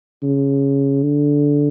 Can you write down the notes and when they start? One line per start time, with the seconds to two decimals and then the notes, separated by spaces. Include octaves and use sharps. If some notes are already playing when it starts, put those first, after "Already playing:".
0.23 C#3
1.03 D3